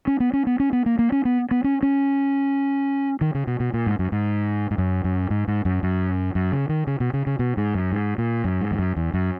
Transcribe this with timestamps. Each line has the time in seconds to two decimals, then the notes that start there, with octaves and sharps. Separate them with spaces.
0.07 C#4
0.20 B3
0.33 C#4
0.47 B3
0.60 C#4
0.73 B3
0.86 A#3
0.99 A#3
1.12 C#4
1.25 B3
1.51 B3
1.64 C#4
1.83 C#4
3.21 D#3
3.34 C#3
3.47 B2
3.60 B2
3.74 A#2
3.86 G#2
3.99 F#2
4.12 G#2
4.71 G#2
4.78 F#2
5.04 F#2
5.30 G#2
5.48 G#2
5.65 F#2
5.83 F#2
6.35 F#2
6.52 C#3
6.69 D#3
6.87 C#3
7.00 B2
7.13 C#3
7.26 C#3
7.39 B2
7.57 G#2
7.74 F#2
7.92 G#2
8.18 A#2
8.44 F#2
8.61 G#2
8.71 E2
8.79 F#2
8.96 E2
9.14 F#2